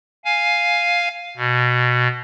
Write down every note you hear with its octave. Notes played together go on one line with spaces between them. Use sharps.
F5 G#5
B2